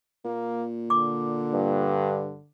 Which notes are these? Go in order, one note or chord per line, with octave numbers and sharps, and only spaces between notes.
A#2 A#3
D3 D6
G2